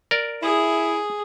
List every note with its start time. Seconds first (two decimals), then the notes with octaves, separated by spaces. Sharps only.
0.11 A#4 D5
0.43 E4 G#4